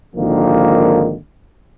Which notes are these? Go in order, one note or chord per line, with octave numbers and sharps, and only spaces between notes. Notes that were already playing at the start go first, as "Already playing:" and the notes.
G#1 D3 D#3 F3 A#3